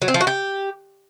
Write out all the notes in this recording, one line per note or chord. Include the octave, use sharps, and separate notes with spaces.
F#3
C4
F3
F#4
G4